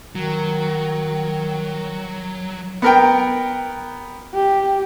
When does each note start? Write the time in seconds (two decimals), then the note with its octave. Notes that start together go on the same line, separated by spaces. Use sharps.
0.15 D#3 F#3
2.82 B3 A#4 G5
4.34 G4